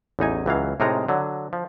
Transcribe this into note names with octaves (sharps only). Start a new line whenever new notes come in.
A1 E2 D#4 G#5
C#2 E3 F#3 F5
A2 C3 G#3 D#4 A#4 A#5
D3 F#3
F3